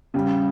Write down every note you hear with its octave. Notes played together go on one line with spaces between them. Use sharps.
C#3 G3